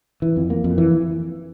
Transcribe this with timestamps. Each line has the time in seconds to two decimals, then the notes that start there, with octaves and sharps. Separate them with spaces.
0.22 E3
0.36 F2
0.50 A#3
0.64 F2
0.78 E3